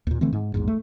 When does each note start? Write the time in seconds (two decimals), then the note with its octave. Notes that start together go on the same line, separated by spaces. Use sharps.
0.07 D#2 A#2
0.21 D3 E3 A3 C4
0.33 G#2
0.54 A#1 E2 G#2
0.68 A3